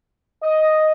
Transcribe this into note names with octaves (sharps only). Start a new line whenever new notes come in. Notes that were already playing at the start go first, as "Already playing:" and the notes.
D#5